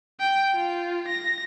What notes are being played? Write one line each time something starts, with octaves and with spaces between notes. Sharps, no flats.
G5
F4
A#6